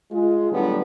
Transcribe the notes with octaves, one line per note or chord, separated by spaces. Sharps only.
G#3 F4
A2 D3 F#3 G3 B3 D4